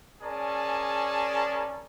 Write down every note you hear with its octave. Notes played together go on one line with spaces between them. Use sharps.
C#4 G#4 A#4 D5 A5